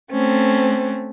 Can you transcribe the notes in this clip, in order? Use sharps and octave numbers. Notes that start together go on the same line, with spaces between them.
A3 C4 C#4